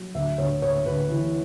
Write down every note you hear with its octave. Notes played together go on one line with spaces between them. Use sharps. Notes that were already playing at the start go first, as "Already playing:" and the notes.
Already playing: F#3
D2 E5
D2 C#5
D2 C#5
D2 B4
E3